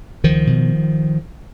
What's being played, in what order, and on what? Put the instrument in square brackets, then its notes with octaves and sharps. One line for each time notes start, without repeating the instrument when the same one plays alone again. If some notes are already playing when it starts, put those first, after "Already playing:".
[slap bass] C#2 D#3 F3
B2